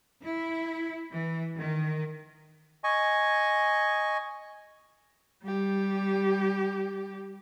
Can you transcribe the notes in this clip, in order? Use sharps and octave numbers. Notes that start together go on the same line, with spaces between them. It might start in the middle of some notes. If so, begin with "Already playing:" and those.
E4
E3
D#3
D#5 G#5 C#6
G3 G4